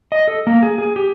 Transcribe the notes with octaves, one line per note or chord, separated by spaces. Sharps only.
D#5
A4
A#3
G#4
G#4
G4